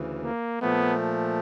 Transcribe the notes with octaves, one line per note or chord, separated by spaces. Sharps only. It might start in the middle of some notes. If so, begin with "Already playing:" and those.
Already playing: D2 C#3 E3
A#3
A#2 F3 A3 B3